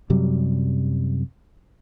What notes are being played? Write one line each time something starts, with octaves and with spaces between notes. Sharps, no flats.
F#2 C3 F#3 G3